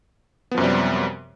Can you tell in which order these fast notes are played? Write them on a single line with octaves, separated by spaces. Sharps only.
B3 F3 F#2 C3 G3